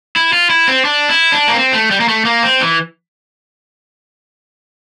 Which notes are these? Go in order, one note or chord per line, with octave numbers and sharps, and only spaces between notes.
E4
F4
E4
C4
D4
E4
D4
A#3
C4
A3
G3
A#3
A3
A#3
C4
E3